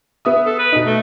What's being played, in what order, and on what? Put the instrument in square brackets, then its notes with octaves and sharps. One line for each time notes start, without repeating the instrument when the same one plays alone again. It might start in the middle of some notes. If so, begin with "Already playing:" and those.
[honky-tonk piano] B3 E5 D#6
[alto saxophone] A4
B4
[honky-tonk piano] B2 D#4
[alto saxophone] A3